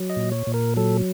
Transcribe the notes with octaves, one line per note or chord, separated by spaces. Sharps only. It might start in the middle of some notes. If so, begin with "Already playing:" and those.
Already playing: F#3
D#5
A#2
C#5
A#2
A#4
F#3 A4